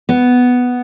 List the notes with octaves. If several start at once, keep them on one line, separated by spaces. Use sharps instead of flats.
B3